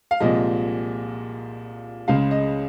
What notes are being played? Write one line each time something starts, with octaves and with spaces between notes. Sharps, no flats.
F5
C2 A#2 F3 G#3 D#5
C#2 C#3 G#3 F5
D#5